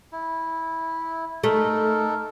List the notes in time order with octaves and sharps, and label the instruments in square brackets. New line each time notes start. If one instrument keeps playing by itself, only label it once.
[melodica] E4
[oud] A3 [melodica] D#4 A4 A#4